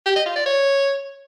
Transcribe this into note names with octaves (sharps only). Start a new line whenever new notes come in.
G4
D#5
F4
D5
C#5